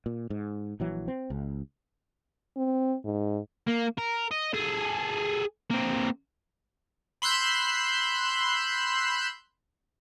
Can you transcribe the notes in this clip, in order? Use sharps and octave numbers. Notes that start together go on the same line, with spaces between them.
A#2
G#2
A#1 E3 F#3
C4
C#2
C4
G#2
A#3
A#4
D#5
G#4 A4
A#3 C4
B5 C6 E6 F#6 G6